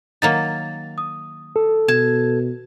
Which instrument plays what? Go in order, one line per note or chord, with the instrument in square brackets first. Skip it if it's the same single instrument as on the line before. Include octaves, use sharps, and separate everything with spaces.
[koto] D#3 F#3 A#3 [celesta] A6
[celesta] D#6
[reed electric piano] A4
[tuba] B2 [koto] A5 [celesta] G#6